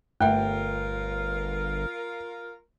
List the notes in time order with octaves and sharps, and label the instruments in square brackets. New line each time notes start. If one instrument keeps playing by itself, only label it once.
[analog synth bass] G1 [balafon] A3 E5 [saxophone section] F4 A#4 [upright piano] G5